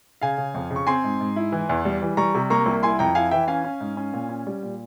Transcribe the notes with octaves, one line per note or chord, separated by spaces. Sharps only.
C#3 F5 G#5
C#3
F2
C#3
C#6
C4 G#5 C6
G#2
G#2
E4
E3
E2
G3
E3
G3 A#5 C#6
C3
A#3 A#5 C#6
C2
E4 G#5 C6
F2 G5 A#5
E4 F5 G#5
E3 E5 G5
C#4 F5 G#5
C#4
G#2
C#4
A#2
C#4
G3
A#2